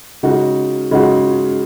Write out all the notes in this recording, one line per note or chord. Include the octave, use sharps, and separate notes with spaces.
C#3 G#3 D#4 F#4
C#3 G#3 D#4 F#4